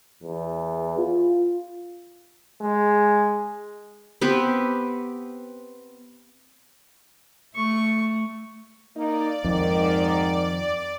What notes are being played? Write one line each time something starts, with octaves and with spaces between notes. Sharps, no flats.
E2
F4
G#3
B3 C4 G4 B4
A3 C#6
A#3 D#4 D5
F2 G#2 D#3